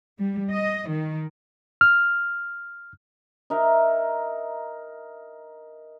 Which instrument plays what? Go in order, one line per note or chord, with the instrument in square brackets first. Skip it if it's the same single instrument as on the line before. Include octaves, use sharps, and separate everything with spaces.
[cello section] G3
D#5
D#3
[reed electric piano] F6
[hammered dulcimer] D#4 A#4 E5